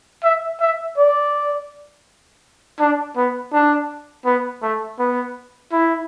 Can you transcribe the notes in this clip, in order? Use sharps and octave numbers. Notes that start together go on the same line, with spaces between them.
E5
E5
D5
D4
B3
D4
B3
A3
B3
E4